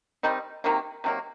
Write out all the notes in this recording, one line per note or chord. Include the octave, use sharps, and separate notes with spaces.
D#3 G3 C4 D#4
C3 D#3 F#3 A#3
C3 D#3 F#3 A#3